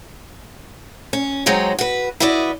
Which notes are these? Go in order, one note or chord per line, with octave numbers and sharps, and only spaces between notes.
C#4
F#3 G#3 C4 D#4 C#5
F#4 B4
E4 F#4 B4 D5 D#5